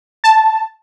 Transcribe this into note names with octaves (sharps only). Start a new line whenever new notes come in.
A5